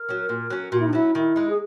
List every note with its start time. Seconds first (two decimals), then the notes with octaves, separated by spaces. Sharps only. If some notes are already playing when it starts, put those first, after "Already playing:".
Already playing: A#4
0.09 F#3 C#4
0.29 A#2
0.50 F#3 C#4
0.72 A#2 F#4
0.79 E4
0.86 D#4
0.93 F#3 C#4 E4
1.15 D#3 E4
1.36 G#3 D#4
1.48 G#4